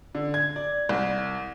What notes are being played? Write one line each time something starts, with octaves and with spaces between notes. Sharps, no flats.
D3
G#6
D5
C2